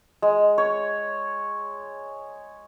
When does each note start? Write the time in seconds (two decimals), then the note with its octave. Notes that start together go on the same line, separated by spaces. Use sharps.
0.22 G#3
0.58 C#5